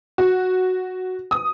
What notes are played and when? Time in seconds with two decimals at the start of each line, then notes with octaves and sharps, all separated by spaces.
0.18 F#4
1.31 D#6